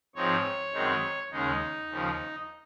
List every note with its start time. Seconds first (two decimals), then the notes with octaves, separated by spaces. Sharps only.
0.15 G#2 F3 C4 D#4 C#5
0.73 F#2 D#3 G#3 C4 D#4
1.31 D#2 C#3 G#3 D#4
1.89 D#2 C#3 F3